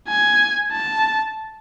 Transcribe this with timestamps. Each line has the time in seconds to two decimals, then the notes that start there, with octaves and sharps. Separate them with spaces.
0.08 G#5
0.72 A5